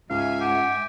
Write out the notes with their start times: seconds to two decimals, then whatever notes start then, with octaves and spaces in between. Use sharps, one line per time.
0.10 C#2 G#2 E5 F5 G#5
0.41 G4 F#5